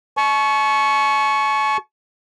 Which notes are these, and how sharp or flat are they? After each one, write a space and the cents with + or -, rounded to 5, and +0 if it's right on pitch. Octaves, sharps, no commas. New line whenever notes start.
A5 -45 C#6 +0